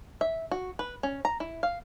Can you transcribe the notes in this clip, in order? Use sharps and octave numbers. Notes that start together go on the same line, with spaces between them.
E5
F#4
B4
C#4
A#5
E4
F5